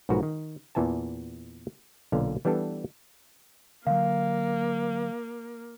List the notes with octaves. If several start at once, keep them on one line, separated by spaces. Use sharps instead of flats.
B1 G#2 F3 F#4 A#4 B4
D#3
E2 A#2 E3 G#5 A5
B1 A#2 D3 F5
E3 G3 B3 D4 A4
D3 F#3 A#3 F5